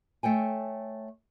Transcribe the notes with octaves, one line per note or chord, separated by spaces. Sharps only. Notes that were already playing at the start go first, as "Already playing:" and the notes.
A3 C#5 G5 G#5